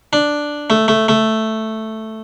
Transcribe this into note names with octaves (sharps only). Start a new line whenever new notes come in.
D4
A3
A3
A3